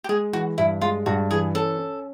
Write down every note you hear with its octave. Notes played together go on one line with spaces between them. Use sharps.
G4
G#3 G#4
E3 F#4
G2 E4
G#3 F4
G2 F#4
E3 G#4
C#4 A4
C#4